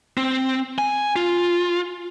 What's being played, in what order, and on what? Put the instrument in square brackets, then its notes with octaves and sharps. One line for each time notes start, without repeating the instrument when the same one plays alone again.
[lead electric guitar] C4
G#5
F4